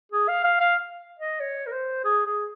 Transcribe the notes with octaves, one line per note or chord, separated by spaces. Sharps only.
G#4
F5
F5
F5
D#5
C#5
A#4
C5
G#4
G#4